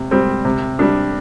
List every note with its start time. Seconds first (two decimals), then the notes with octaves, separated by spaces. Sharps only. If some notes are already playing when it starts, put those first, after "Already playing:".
Already playing: C3
0.11 G3 C4
0.45 C3
0.79 G3 D4